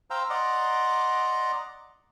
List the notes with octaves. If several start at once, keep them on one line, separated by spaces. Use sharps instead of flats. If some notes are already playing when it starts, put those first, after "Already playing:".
C5 F5 G5 A#5 E6
D5 D#5 F#5 A#5 C6 D6